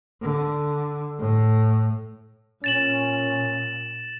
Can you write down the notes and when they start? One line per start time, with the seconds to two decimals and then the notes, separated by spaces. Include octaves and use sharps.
0.21 D3
1.19 A2
2.64 A#2 C#4 A6 E7 F#7